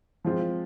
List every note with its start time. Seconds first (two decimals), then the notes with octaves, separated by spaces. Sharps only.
0.25 F3 G#3 C4 F4